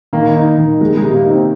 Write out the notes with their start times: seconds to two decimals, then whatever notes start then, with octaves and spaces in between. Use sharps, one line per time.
0.13 D#3 A#3
0.35 D#4
0.58 D#3
0.81 G#3 A#3
0.97 G#3
1.03 C3
1.15 A#3
1.26 D#4
1.31 C4